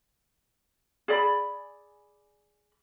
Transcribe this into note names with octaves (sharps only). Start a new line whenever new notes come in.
G#4 D5 B5